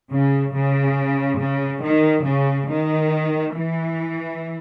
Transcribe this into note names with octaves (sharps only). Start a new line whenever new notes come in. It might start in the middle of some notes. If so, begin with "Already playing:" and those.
C#3
C#3
C#3
D#3
C#3
D#3
E3